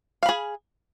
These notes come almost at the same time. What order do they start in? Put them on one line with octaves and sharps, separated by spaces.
F5 B5 G#4